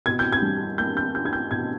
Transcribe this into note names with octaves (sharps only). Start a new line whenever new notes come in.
B2 G#6
G6
G#6
G3
A#3 G6
G6
C#4 G6
G#6
G6
B2 G#6